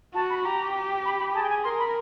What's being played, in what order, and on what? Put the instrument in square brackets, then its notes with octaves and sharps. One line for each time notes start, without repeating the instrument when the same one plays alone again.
[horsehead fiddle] F#4 [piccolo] A5
[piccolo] B5
[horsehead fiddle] G4 [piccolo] A#5
[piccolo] B5
B5
[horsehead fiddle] G#4 [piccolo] A5
[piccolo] G5
G#5
[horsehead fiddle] A#4 [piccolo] C6
[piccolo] B5